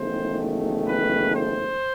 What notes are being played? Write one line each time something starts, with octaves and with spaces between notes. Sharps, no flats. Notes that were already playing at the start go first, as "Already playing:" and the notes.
Already playing: F#1 E2 D#3 A3 C5
B4
C5